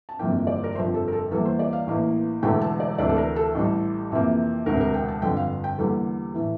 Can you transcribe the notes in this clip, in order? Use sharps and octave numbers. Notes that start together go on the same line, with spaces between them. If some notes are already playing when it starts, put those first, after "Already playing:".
A5
G1 F2 C3 E3 A#3 G5
D5
A#4
G1 F2 C3 F3 C5
A4
A#4
A4
E2 E3 G3 A#3 A4
C5
D5
F5
A1 A2 E3 A#3
E1 E2 D3 A3 G5
A5
D5
D2 C3 E3 A3 D5
A4
A#4
A4
A1 A2 G3
F2 C3 E3 A#3
E1 D2 C3 A#4
A#4
G5
A5
G1 F2 D3 G5
F5
G5
E2 D3 G3 A#3 A4
A2 E3